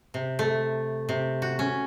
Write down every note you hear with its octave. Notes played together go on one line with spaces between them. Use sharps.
C3
A3
C3
F#4
C#4